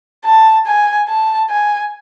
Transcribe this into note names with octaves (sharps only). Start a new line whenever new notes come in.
A5
G#5
A5
G#5